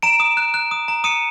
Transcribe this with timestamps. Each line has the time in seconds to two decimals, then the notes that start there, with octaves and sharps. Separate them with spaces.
0.03 A#5 D7 E7
0.20 D#6
0.37 F#6
0.54 F#6
0.71 D#6
0.88 A#5
1.04 D#6 C#7 D#7